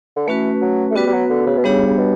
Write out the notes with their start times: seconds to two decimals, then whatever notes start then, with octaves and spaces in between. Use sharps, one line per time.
0.16 D3
0.27 E3 A3 C#4 F#4 B4
0.61 F#3
0.91 A3
0.96 G3 B3 F#4 B4
1.07 G3
1.13 F#3
1.30 D3
1.47 C#3
1.57 B2
1.64 C#3 G3 B3 D4 G4 C#5
1.87 C#3
1.98 B2